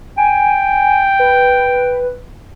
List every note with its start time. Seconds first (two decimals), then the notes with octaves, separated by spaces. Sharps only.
0.18 G5 G#5
1.19 B4